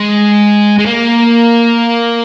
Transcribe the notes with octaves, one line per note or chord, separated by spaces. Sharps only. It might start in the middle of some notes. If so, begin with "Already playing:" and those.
Already playing: G#3
G#3
A#3